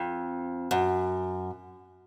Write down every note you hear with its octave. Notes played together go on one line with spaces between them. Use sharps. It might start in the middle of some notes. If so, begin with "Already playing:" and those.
Already playing: F2
F#2